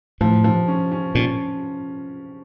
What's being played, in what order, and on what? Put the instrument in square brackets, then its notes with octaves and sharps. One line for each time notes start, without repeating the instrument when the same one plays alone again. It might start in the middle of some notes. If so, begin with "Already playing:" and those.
[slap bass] A2 [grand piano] F3
[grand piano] F3
C#4
C#4
[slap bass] A#2 [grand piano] C#4